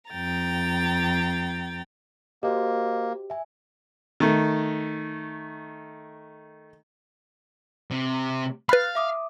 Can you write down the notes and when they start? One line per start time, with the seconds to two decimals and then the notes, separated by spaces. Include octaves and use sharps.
0.10 F2 G5 A#5 A6
2.43 A#3 F#4 G4 C5 D#5
3.30 E5 G#5
4.20 D#3 A3
7.91 C3
8.69 B4 F5 B5 F6 F#6 A6
8.95 E5 D6 D#6